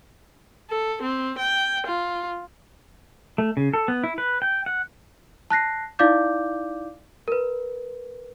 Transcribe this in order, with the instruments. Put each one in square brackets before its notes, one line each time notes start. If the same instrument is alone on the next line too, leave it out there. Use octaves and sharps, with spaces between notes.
[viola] A4
C4
G5
F4
[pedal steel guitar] A3
C#3
A4
B3
E4
B4
G5
F#5
[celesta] A5 F#6 A#6 C7
D#4 E4 D5 F5 D6 G6
A#4 B4